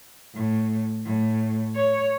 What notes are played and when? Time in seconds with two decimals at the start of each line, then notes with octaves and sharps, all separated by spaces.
0.35 A2
1.04 A2
1.76 C#5